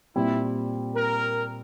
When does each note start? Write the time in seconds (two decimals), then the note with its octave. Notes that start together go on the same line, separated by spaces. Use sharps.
0.15 A#2 G3 C4 E4
0.95 A#4